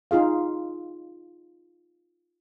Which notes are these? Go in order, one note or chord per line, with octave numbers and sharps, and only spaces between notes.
D#4 F4 G#4 F5